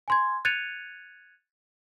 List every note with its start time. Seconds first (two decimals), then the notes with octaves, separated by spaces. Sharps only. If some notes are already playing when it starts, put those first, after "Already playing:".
0.08 G#5 C6 G#6
0.45 F#6 G#6 A6 C#7 D#7 F7